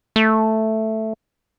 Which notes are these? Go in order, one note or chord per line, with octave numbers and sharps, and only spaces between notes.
A3